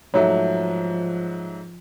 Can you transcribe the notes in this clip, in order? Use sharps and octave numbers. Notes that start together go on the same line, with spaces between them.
G#2 F3 F#3 A3 C#5 E5